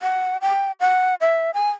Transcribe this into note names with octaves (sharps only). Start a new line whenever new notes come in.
F#5
G5
F#5
E5
G#5